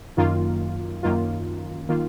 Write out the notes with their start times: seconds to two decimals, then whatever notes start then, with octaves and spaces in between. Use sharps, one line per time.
0.17 F#2 D#3 A#3 F4
1.03 F#2 D#3 A#3 F4
1.89 D#3 A#3 F4